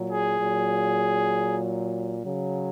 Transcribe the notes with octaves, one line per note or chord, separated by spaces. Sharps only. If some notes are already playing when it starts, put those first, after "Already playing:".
Already playing: A#2 F#3
G#4
A#2 F#3
C#3 F#3